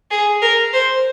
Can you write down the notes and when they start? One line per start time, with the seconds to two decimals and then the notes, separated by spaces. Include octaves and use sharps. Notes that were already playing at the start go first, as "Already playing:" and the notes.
0.11 G#4
0.42 A#4
0.73 C5